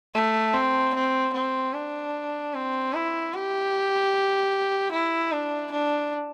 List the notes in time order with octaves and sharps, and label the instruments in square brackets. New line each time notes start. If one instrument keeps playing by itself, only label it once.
[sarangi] A3
C4
C4
C4
D4
C4
E4
G4
E4
D4
D4